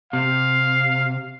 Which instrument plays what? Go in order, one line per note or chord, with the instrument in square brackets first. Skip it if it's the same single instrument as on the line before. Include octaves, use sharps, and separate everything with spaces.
[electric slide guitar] C3 [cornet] F5